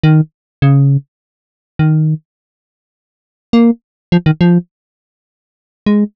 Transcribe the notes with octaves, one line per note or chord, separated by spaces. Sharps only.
D#3
C#3
D#3
A#3
F3
D#3
F3
G#3